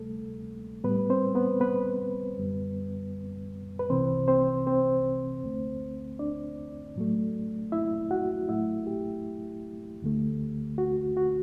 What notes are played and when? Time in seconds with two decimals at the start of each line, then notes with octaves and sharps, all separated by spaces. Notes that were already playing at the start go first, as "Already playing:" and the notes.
Already playing: D2 C3 G3 A3 A4
0.84 A2 G3 B3 B4
1.10 C4 C5
1.35 B3 B4
1.60 B3 B4
2.37 F#2 D3 G3
3.79 B4
3.90 C2 C3 E3 C4 C5
4.28 C4 C5
4.67 C4 C5
5.43 D2 D3 A3
6.19 D4 D5
6.96 A2 F#3 A3
7.72 E4 E5
8.11 F#4 F#5
8.48 A2 F#3 A3 E4 E5
8.87 G4
10.02 D2 D3 A3
10.78 F#4
11.17 F#4